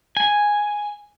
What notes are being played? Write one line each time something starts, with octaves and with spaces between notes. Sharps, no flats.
G#5